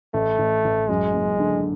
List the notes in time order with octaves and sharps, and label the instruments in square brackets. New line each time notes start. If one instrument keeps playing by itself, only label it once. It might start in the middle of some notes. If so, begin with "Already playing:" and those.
[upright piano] A1 [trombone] A3
[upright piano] A1
A1
[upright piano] F#2 [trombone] G#3
[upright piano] F#1
D3